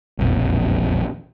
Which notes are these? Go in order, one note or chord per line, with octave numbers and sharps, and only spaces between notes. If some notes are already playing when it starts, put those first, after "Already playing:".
E1 A#1 F2